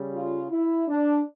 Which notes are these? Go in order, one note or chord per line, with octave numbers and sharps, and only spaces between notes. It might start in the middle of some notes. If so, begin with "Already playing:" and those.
Already playing: C#3 G3
F4
E4
D4